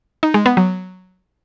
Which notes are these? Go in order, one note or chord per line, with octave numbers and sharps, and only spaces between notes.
D#4
G#3
B3
F#3